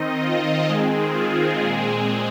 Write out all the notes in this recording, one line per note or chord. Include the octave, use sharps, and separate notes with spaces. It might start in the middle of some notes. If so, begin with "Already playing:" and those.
Already playing: D#3 C4 D#4 D#5
F4
D#3 G#3 C4 G#4
F4
A#2 G#3 C4 G#4